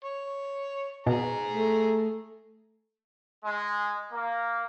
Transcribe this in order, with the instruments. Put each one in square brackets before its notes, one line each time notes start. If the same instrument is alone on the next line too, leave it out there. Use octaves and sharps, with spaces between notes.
[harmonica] C#5
[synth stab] B2 [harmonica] G#4 A#5
[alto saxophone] A3
[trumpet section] G#3
A#3